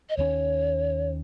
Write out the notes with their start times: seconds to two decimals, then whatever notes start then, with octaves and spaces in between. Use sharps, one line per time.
0.10 D#5
0.17 D#2 D#3 F#3 C#4 C#5